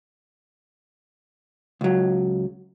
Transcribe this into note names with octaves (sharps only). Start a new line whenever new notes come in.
C#2 F#3